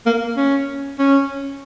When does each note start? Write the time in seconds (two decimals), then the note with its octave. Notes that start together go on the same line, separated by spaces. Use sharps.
0.06 A#3
0.37 C#4
0.98 C#4